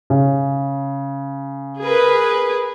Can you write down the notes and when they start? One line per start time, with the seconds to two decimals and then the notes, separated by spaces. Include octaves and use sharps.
0.10 C#3
1.79 G#4 A#4 B4